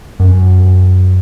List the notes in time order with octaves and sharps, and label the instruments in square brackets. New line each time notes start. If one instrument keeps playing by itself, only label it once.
[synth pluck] F#2